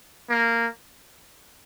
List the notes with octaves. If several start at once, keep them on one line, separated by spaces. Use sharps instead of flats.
A#3